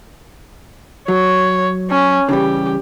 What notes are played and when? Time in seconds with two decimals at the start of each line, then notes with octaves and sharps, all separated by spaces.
1.08 F#3 C#5
1.90 C#4
2.29 C#3 E3 G3 G4